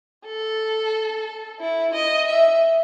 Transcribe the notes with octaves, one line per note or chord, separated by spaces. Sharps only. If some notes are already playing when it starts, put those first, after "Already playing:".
A4
E4
D#5
E5